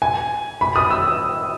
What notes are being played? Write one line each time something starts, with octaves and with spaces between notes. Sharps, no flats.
G#5
B5
D#6
E6